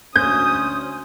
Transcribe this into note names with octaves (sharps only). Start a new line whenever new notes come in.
D2 C#4 C5 D#6 G6